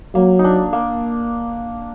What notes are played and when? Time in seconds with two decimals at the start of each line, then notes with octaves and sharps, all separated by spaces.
0.15 F#3 A#3
0.39 D#4
0.44 D4
0.73 A#3